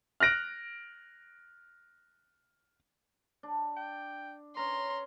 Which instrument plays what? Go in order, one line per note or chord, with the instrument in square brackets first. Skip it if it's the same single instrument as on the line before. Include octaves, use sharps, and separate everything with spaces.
[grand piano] F6 F#6 A#6 D7
[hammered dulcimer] D4
[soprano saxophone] G5
[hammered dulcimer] C#4 B4 [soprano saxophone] A#5 [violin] C6